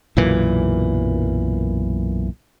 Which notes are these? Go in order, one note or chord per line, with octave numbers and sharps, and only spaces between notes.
B1 F#2 A#2 E3